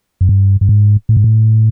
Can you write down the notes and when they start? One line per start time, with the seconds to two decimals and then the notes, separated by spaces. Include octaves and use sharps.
0.21 F#2
0.29 G2
0.61 G2
0.69 G#2
1.09 A2
1.17 G#2
1.24 A2